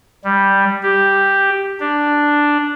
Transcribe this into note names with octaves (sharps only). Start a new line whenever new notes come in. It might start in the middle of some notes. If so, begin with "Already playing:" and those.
G3
G4
D4